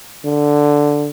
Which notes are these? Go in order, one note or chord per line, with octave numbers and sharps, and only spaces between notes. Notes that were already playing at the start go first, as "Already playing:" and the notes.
D3